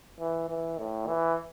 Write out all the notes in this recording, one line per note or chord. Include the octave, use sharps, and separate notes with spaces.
E3
E3
A2
E3